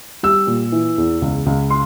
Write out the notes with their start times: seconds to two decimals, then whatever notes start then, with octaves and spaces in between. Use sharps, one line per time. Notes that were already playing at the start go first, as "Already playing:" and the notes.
0.23 G3 E6
0.47 A#2
0.72 E3
0.98 E2
1.22 C#2
1.46 C#2
1.70 C6